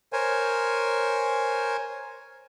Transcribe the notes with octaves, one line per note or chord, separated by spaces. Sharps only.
A#4 C5 C#5 G#5